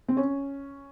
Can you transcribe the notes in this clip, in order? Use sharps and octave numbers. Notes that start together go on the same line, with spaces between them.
C4
C#4